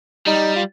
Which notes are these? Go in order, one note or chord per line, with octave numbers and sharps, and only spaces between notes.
G3 D#4
F4